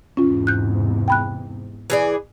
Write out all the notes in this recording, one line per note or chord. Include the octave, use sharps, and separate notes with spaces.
E2 G#2 C3 C#4 F4
F#6 G6
G5 B5 F#6
E3 G#4 D5